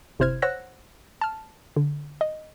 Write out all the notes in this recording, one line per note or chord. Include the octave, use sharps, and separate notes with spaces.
G1 C3 E4 C5 F6 G#6
C5 C#5 F#5 E6 F#6 A#6
A5 F6
D3
D#5